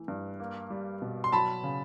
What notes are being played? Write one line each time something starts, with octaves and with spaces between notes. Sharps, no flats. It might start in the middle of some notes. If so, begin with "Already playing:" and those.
Already playing: E3 A3
G2
A#3
G3
B2
C6
F#3 A5 B5
C#3